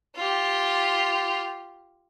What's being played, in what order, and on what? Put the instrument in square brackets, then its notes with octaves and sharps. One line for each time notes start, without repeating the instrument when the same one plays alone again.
[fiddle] F4 G4